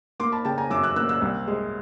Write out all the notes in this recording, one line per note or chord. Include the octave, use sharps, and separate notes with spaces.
A#3 C6 D6
A5 B5
C#3 G5 A5
G#5 A#5
F#2 D6 E6
E6 F#6
A#3 E6 F#6
E6 F#6
C2
G#3